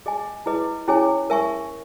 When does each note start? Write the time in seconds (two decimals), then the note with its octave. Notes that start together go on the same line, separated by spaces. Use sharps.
0.06 G#4 D#5 G#5
0.46 E4 G#4 B4 D#5
0.88 C#4 E4 G#4 C#5 G#5
1.30 A#4 E5 G#5 C#6